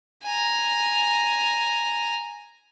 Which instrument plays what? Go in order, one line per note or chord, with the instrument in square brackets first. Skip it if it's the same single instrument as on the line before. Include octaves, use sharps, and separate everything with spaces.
[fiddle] G#5 A#5